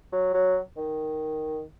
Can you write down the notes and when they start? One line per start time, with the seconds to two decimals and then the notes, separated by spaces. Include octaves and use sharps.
0.12 F#3
0.34 F#3
0.77 D#3